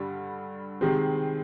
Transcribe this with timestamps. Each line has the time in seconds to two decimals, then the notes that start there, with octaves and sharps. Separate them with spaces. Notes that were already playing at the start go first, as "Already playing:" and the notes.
Already playing: G2 D3 G3
0.81 C3 D#3 G#3 C4